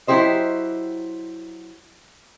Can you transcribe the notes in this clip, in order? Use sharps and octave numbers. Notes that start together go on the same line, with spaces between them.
F#3 E4 G4 C5 D#5